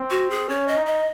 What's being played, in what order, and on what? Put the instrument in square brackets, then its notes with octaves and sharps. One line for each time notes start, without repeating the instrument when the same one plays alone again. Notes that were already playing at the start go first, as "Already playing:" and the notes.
Already playing: [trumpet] C4
[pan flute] F#4
G#4
[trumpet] C#4 [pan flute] C#5
[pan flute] D#5
[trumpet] D#4
[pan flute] D#5